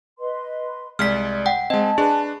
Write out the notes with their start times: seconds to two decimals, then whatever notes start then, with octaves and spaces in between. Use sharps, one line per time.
0.19 B4 D#5 C6
0.99 C2 G#3 D5 F6 B6
1.46 F#5 G5
1.70 G#3 C4 D#5 G#5 A5
1.98 D4 G#4 B4